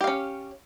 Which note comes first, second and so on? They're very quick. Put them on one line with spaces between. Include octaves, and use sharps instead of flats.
G4 F5 C#4